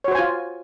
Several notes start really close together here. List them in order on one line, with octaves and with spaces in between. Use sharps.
C#5 F#4 C5 G#5 F4